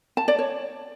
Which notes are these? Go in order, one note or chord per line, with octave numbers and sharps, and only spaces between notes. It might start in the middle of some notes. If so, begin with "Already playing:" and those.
A5
D5
C#5